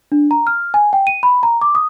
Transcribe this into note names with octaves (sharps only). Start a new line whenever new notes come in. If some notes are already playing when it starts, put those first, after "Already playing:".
D4
A#5
F6
G#5
G5
D#7
B5
A#5
D6
D#6